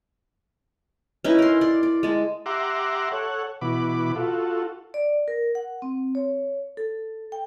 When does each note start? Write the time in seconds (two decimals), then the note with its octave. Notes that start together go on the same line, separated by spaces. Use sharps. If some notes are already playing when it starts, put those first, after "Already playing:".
1.24 C#4 D#4 E4 B4
1.39 A#4 C6
1.61 D5 C6
1.83 D5
2.03 G#3 A5
2.46 G4 E5 F#5 A#5 C6 D6
3.12 A4 C#5 F#5
3.61 B2 E3 F#4 B5 D6
4.16 F4 F#4 A4
4.94 D5
5.28 A#4
5.55 F#5
5.82 C4
6.15 C#5
6.77 A4
7.32 G5